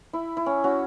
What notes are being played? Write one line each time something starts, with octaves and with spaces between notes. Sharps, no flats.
E4
E4
C#4
C#4 F#4